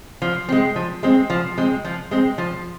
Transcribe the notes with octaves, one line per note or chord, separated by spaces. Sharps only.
F3
G#3 C4
F3
G#3 C4
F3
G#3 C4
F3
G#3 C4
F3